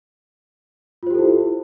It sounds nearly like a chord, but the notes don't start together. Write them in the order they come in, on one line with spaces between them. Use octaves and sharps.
F4 C5 G4 A4 E4